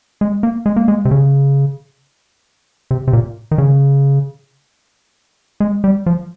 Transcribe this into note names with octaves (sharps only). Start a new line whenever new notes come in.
G#3
A#3
G#3
A#3
G#3
C3
C#3
C3
C3
A#2
D#3
C#3
G#3
G3
F3